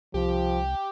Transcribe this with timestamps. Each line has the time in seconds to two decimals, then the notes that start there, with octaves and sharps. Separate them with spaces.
0.14 C2 F3 G4